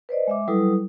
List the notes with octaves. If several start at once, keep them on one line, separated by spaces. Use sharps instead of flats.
B4 C5 D5 D#5
G#3 E5 D6
F#3 G3 E4 A4 B4 D#6